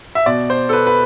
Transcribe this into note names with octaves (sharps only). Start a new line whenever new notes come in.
E5
B2 D5
C5
A4
B4
B4